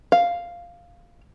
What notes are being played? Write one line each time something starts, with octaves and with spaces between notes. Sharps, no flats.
F5